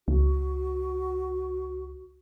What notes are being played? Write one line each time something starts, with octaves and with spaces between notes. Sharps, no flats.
C#2 F#4